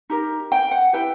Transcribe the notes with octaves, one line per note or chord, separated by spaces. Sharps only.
D#4 G4 A#4
G5
F#5
E4 G4 B4 G5